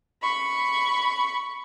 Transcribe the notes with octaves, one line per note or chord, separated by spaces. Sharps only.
B5 C#6